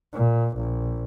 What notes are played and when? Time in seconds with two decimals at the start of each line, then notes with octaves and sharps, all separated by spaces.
0.13 A#2
0.58 A#1